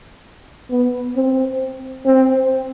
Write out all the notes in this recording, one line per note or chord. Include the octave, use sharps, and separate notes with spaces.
B3
C4
C4